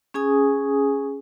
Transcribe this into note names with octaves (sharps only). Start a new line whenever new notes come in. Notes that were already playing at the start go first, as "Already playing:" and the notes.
C#4 G#4 G#5 D#6